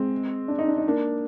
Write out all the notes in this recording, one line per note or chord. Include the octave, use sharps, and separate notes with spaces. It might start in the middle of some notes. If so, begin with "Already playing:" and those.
Already playing: G#3 C4
D4
D#4
D4
D#4
A#3 D4